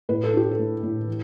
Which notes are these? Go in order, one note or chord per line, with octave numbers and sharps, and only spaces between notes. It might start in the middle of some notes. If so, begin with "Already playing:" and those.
A2 B4
A4
D4 G4
A4
A3
A2
E3